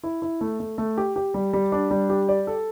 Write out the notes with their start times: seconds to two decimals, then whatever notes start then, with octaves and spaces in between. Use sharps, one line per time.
0.03 E4
0.22 E4
0.41 A3
0.60 A3
0.78 A3
0.98 G4
1.16 G4
1.34 G3
1.53 G3
1.72 D4
1.91 G3
2.10 G4
2.29 D5
2.47 A4